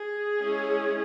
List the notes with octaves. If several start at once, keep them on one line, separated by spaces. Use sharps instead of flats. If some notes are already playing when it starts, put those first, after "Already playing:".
Already playing: G#4
G#3 C#4 E4